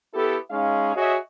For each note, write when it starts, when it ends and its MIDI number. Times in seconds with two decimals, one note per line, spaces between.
0.14 0.36 59
0.14 0.36 64
0.14 0.36 67
0.14 0.36 69
0.51 0.95 56
0.51 0.95 61
0.51 0.95 63
0.51 0.95 77
0.95 1.16 66
0.95 1.16 68
0.95 1.16 73
0.95 1.16 75
0.95 1.16 76